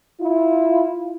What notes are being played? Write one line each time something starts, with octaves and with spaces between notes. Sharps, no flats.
E4 F4